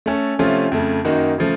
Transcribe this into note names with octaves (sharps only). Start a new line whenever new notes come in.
A3 C#4 A4
C3 F3 A3 C#4 F4
F2 C#3 A3
F#2 D#3 A#3 D#4 F#4
C#3 F3 A3